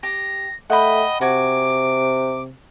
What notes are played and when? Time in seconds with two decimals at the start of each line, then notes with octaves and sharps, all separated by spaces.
0.03 G4 A#6
0.70 A3 D#5 F#5 G5 B5
1.21 C3 F#4 G#5 D6